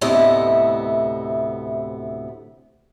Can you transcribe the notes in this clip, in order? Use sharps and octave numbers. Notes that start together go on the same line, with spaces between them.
D2 A2 C3 B3 E4 D#5